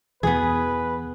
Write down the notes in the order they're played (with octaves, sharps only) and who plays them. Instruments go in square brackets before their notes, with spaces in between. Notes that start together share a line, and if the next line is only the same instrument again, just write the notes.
[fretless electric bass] E2 B2 E3 [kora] B3 G#4 [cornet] B4